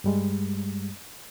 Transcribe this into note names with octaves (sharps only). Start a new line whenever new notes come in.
G2 G3 G#3